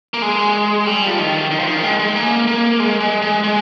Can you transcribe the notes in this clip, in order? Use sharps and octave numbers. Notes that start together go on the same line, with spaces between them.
A#3
G#3
G3
F3
D#3
D#3
F3
D#3
G#3
G#3
A#3
A#3
G#3
G#3
G#3
G#3